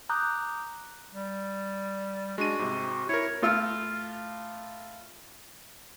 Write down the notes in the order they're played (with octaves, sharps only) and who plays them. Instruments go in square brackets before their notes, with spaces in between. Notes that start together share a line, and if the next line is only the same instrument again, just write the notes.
[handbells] A#5 D6 D#6 F#6 G6
[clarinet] G3
[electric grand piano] G#3 D4 D#7 [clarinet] F#4
[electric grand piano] G#2 C3
[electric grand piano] E4 A#4 [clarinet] C#5
[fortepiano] A2 F4 E6 F6